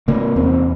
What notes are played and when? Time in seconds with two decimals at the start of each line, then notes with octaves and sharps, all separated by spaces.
0.08 C3 A#3
0.36 E2 C4